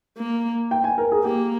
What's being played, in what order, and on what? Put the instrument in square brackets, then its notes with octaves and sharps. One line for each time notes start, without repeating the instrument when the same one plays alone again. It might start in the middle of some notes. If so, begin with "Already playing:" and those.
[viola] A#3
[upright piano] G5
G#5
A#4
G#4
[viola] A#3 [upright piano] G4